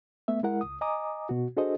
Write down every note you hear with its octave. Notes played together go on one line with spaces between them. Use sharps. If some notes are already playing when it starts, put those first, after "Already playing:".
A3 B3 E5
G#3 E4 A#4 F#5
C#2 D#6
D#5 G#5 A#5 D6 D#6
B2 F#4
D4 F#4 G#4 A4 C5 D#5